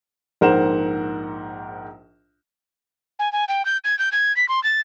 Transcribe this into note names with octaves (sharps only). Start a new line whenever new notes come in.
A#1 G#2 A#4 C5 F#5 E7
G#5
G#5
G5
G6
G#6
G6
G#6
B6
C6
A6